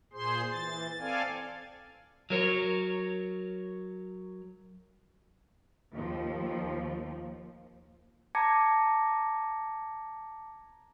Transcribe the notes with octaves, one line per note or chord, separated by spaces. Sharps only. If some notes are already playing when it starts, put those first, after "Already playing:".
A#2 G#4 C5 C6
E3 A6
C4 A4 D5 F5 G#5
F#3 A#4 C#5
D#2 F3
A5 A#5 D6 G#6 A#6 C#7